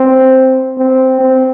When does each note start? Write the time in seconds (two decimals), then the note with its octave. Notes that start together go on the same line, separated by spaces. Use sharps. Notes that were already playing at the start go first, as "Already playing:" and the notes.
Already playing: C4
0.79 C4
1.20 C4